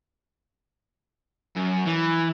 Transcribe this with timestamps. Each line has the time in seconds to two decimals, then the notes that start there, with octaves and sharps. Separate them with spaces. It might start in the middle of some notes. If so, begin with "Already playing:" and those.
1.57 F#2
1.87 E3